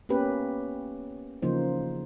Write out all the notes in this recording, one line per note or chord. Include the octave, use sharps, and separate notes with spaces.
A#3 B3 C#4 G4 B4
C#3 E3 F3 A#3 D#4 C5